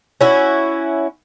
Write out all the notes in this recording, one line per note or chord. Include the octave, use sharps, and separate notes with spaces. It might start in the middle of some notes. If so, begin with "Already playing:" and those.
C#4 E4 F#4